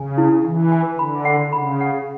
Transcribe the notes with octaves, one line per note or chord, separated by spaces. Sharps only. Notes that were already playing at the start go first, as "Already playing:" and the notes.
Already playing: C#3 G#5
E4
E3 G#5
G#5
D3 B5
F#5
C#3 B5
F#5